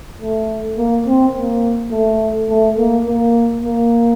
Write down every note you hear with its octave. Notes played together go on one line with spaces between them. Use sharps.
A3
A#3
C4
A#3
A3
A3
A#3
A#3
A#3